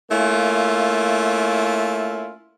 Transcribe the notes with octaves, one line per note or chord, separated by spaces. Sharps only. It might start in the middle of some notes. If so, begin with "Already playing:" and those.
A3 A#3 C#4 E4 F4